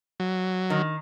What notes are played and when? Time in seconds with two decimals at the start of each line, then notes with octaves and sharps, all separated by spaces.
0.20 F#3
0.70 D#3